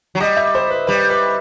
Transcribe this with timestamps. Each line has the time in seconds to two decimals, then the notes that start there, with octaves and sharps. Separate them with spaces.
0.15 F#3
0.20 G3 D#5
0.37 E5
0.55 C5
0.70 B4
0.87 G3 B4
1.10 B4